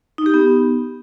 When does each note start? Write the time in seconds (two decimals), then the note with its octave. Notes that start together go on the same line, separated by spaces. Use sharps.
0.18 D#4
0.26 G4
0.34 B3